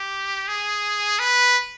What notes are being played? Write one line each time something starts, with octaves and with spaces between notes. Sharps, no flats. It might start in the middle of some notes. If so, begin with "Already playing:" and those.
Already playing: G4
G#4
B4